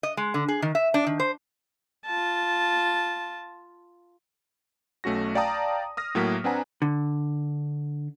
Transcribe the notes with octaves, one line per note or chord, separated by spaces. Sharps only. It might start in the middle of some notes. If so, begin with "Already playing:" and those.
D#5
G#3
D3
G#4
D#3
E5
D4
D#3
C5
F4 A5
B1 A3 C#4 F#4 A#6
D5 F5 G5 A5 A#5 D#6
D#6 F6 A#6
A2 F#3 A#3 B6
C4 D4 B4 F#5 G#5 A#5
D3